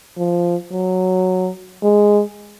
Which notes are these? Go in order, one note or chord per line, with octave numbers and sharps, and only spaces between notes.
F3
F#3
G#3